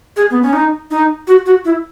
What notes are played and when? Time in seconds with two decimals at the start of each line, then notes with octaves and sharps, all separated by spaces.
0.16 G#4
0.30 B3
0.42 C#4
0.53 D#4
0.91 D#4
1.27 F#4
1.46 F#4
1.65 E4